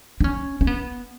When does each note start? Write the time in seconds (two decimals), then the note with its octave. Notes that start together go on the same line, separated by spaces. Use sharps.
0.20 D4
0.24 C#4
0.61 C#4
0.67 B3